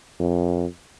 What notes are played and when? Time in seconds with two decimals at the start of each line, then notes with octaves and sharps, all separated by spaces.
0.20 F2